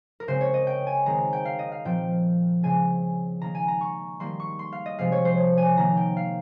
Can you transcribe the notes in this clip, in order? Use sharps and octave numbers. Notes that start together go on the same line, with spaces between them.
A#4
C#3 G#3 C4 C5
C#5
D#5
G5
G#5
D#3 G#3 C4 A#5
G5
F5
D#5
F5
A#2 F3 C4 G5
C#3 G#3 C4 G#5
D#3 A#3 A#5
G#5
A#5
C#6
D#3 G3 A#3 C6
C#6
C6
F5
D#5
C3 F3 G#3 C4 F5
C#5
C5
C#5
G#5
D#3 A#3 A#5
G5
F5